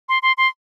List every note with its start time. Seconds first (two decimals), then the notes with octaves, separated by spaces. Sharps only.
0.09 C6
0.22 C6
0.38 C6